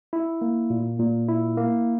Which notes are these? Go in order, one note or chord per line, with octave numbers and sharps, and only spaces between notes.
E4
A#3
A#2
A#2
E4
A#3